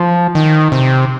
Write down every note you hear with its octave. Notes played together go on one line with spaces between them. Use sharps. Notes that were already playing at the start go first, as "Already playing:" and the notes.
Already playing: F3
D#3
C3